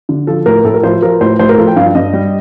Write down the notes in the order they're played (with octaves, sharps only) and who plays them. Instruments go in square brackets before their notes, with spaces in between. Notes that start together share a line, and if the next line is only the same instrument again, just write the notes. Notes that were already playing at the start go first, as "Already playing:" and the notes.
[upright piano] D3
F3 A4
A2 A#4
A2 A4
A#4
F3 C5
F3 A#4
A2 C5
A2 C5
A#4
F3 A4
G5
G2 F5
G2 D#5
G3